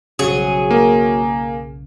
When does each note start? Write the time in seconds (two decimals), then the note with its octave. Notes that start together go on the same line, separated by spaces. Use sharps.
0.19 B1 F#2 C#3 F#3 G#4
0.71 A#3